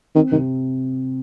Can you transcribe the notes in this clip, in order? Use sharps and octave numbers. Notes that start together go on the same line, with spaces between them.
D#3 C4
C3 D#3